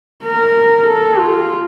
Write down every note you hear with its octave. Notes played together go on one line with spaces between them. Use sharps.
A#4
A4
F4